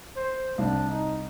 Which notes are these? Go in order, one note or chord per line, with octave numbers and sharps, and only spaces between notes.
C5
C2 D4
D#4